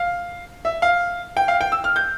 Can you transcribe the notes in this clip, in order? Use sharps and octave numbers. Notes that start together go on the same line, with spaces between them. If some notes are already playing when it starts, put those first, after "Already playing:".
Already playing: F5
E5
F5
G5
F5
G5
E6
F6
G6